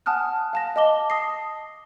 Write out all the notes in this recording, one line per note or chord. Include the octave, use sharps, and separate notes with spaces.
F#5 G#5 A5 D#6 F6 F#6
F5 A5 A#6
D#5 A5 D6 G7
A5 D#6 A#6 C7